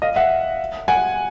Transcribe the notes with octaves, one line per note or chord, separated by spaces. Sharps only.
D#5 F5
E5 F#5
F#5 G#5